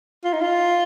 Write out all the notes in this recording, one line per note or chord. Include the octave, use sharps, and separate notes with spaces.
F4
D#4
F4